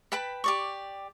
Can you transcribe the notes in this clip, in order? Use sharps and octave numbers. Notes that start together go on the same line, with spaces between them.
B4 G5 A5 B5
G4 D5 C#6